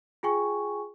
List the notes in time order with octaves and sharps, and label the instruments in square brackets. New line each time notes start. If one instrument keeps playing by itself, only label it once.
[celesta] F4 G#4 G5 G#5 C#6